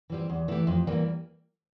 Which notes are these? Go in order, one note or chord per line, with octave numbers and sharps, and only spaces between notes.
E3 G3 C4 G4
E2
E3 A3 E4 G4
F2
E3 G3 A#3